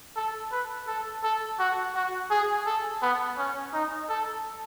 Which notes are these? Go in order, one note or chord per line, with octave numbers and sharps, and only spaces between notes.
A4
B4
A4
A4
F#4
F#4
G#4
A4
B3
C#4
D#4
A4